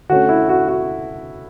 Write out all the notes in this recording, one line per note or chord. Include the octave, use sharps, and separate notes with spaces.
D3 A3 C#4 F#4
E4
F#4
F#4